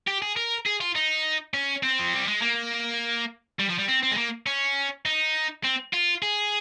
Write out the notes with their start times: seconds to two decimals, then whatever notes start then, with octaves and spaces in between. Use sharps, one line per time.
0.08 G4
0.22 G#4
0.36 A#4
0.66 G#4
0.81 F4
0.95 D#4
1.54 C#4
1.83 C4
2.00 F3
2.14 G3
2.28 G#3
2.42 A#3
3.59 G3
3.69 F3
3.78 G3
3.88 C4
4.03 C4
4.11 G#3
4.17 A#3
4.46 C#4
5.06 D#4
5.64 C4
5.93 F4
6.22 G#4